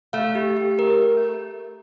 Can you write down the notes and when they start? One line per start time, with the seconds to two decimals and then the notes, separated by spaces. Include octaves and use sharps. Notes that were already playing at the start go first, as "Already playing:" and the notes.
0.13 A3 F5
0.35 G4
0.57 G4
0.79 A#4